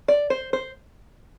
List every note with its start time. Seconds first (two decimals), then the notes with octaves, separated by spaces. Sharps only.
0.08 D5
0.30 C5
0.53 C5